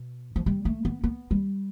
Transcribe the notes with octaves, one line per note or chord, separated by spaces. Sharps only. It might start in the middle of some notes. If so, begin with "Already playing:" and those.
Already playing: B2
F3
G3
A3
B3
B3
G3